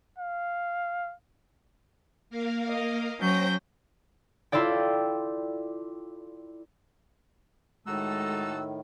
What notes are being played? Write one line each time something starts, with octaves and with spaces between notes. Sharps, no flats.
F5
A#3 A#4 F5
D#5
F#3 C#4 C5 G5 G6 A#6
E4 F4 A4 D5 G5
A2 D#3 G#3 D#4 F#4 A4 E6